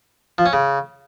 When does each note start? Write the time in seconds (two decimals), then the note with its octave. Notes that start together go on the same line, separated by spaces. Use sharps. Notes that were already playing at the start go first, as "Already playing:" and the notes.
0.38 F3
0.46 C#4
0.53 C#3